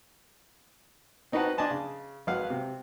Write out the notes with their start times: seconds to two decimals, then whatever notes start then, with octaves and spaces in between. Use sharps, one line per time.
1.32 C4 D#4 F#4 B4 F#5 A5
1.58 D4 D#5 G#5 A5 C6
1.71 C#3
2.27 G#1 F#3 B4 F5 F#5
2.50 C3